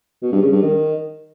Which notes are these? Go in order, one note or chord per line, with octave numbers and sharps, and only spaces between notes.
B2
G2
C#3
G2
D#3